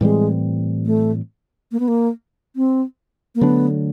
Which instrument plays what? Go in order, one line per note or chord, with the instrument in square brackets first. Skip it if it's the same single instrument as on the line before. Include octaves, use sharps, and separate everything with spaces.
[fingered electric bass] A2 E3 G3 C4 [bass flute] G#3
[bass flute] A3
A#3
B3
A#3
C4
A#3
[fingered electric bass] D3 F#3 A3 D4 [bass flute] B3